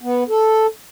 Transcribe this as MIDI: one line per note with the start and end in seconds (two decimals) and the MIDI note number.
0.01 0.24 59
0.29 0.67 69